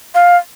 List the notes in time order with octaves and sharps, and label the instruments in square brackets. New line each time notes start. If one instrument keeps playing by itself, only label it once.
[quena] F5